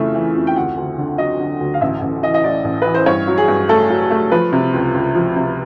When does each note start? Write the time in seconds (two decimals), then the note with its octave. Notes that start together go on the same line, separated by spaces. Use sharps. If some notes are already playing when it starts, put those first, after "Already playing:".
Already playing: F2 C#3 E3 A3 E5
0.14 E3
0.35 F2
0.47 G5
0.56 D2 F#5
0.77 D2
0.98 D3
1.18 F#3 D#5
1.40 D3
1.60 D2
1.74 F5
1.81 A1 E5
2.02 A1
2.23 E3 D#5
2.34 D#5
2.44 A2 D5
2.64 A1
2.82 E3 B4
2.94 C5
3.06 G2 C#5
3.27 F#3
3.38 G#4
3.48 G2
3.69 A3 A4
3.90 F#3
4.11 A3
4.32 F3 B4
4.52 C3
4.73 C#2
4.94 C#2
5.15 F3
5.36 C3